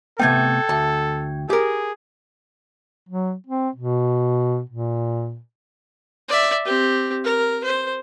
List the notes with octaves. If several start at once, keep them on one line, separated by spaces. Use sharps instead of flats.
C3 A3 B3 A4 G5 G#6
D2 A5
G4 G#4 A#4
F#3
C4
B2
A#2
D5 E5
C4 G4
A#4
C5